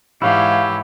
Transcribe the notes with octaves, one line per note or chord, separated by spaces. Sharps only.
G#2 E3 E4 G4 C#5 F5